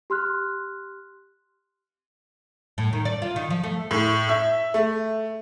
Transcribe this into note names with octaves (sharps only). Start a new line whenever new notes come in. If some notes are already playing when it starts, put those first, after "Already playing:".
G4 C6 F6 F#6
A2
D#3
D5
F4
D#3
F3
A3
A2
E5
A3